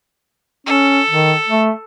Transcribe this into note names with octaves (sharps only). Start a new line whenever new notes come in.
C#4 A4
D#3
A3